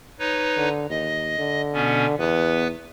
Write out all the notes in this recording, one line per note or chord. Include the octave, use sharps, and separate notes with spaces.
D#4 B4 C#5
D3
D#2 D#5
D3
B2 B3 C#4
E2 B3 B4